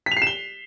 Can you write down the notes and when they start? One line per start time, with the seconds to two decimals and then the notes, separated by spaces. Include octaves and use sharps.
0.06 B6
0.11 F7
0.17 C7
0.22 E7
0.27 G7